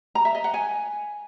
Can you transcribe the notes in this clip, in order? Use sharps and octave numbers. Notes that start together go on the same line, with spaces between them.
A#5
E5
D#5
F#5
G#5